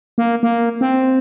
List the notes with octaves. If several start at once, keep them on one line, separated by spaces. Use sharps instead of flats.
A#3
A#3
C4